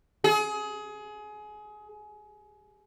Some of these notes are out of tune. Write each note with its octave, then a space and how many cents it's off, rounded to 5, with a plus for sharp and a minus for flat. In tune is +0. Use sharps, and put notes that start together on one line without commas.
G#4 +25